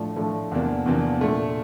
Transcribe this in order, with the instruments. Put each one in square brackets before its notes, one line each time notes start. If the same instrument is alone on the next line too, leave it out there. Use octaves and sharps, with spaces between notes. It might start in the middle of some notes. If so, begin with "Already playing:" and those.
Already playing: [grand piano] A2 F3 A3 D4
A2 F3 A3 D4
E2 C3 F3 A#3 D4
E2 C3 F3 A#3 D4
A#2 A3 D4